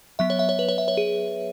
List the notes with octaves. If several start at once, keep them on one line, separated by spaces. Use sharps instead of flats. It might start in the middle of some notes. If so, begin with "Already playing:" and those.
F#3 B3 E5
C#5
E5
C#5
B4
C#5
E5
C#5
G#4